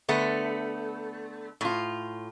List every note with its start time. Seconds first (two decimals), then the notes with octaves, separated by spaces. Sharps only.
0.09 D3 A3 B3
1.61 A2 F4